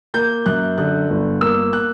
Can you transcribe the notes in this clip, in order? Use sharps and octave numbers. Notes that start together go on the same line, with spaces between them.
A#3 G6
F#2 F#6
D3 F#6
G1
A#3 E6
F#6